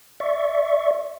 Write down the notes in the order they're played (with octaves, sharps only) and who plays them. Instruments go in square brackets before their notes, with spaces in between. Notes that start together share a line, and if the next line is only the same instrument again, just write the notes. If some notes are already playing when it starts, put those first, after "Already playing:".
[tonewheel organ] D5 E5 C#6